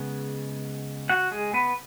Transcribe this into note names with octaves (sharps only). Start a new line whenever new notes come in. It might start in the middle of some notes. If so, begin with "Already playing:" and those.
Already playing: C#3 G#3 B3
F#4 F#5
G#3 G#4
B3 B4